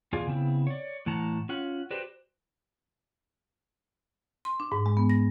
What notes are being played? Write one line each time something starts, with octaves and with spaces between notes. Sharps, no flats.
E2 B2 F4 G#4 D5 G#5
C#3 B3 C4 E4
C#5 D5
A2 E3 F#5 A5 A#5
C#4 F4 F#5
F#4 G4 B4 C5 D5
C6
D4
G#2
G#3
B3
A#6